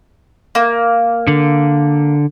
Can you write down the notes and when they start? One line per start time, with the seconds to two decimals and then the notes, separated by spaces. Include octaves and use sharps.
0.55 A#3
1.28 D3